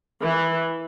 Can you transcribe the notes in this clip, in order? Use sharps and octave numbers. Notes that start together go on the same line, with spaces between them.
E3